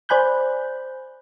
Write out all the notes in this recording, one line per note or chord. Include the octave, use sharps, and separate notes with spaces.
C5 D5 G#5 B5 F#6 G6